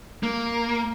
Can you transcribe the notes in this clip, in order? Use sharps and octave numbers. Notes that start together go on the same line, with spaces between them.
A#3